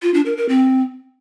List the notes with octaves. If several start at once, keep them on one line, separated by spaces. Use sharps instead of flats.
F4
D4
A#4
A#4
C4